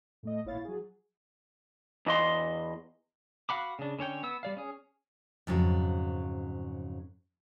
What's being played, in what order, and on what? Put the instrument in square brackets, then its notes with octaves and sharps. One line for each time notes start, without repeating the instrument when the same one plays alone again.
[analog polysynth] A2 A3 D#5
G#1 A#2 E4 C#5 F5 A6
F#3 G#4
[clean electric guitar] E2 D#5 C6
[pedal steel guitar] F#4 F5 F#5 B5 D6
C#3 D4
D3 C#4 C#5 G5
B3 E6
G3 D5 F5
C#4 G#4
[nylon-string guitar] F2 G#2 C#3 F#3